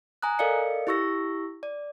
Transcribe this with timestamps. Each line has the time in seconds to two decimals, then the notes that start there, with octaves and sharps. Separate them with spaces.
0.22 G#5 A#5 D#6 F#6
0.39 A4 A#4 D5 D#5 F5 C#7
0.87 E4 G4 C#6 E6 A#6
1.63 D5